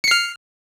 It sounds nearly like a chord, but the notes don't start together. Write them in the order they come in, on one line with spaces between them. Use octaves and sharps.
C#7 C7 F6